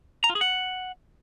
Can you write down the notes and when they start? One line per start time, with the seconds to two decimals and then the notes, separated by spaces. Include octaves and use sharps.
0.24 A#5
0.30 F4
0.35 G#4
0.41 F#5